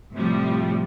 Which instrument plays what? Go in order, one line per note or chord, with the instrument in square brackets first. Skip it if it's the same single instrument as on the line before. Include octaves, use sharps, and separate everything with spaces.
[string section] A2 C3 F3 G3